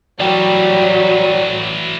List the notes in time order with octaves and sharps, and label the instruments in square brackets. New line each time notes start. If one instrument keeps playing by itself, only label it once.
[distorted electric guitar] E3 A3 [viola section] F#3 [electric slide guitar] D5 G5